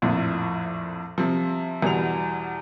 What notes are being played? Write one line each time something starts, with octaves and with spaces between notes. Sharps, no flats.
A#1 F2 A2
C3 F3
E2 B2 G3 F7